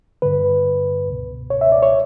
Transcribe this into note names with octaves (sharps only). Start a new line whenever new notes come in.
G2 D3 B4
C#2
B2
C#5
E5
D5
C#5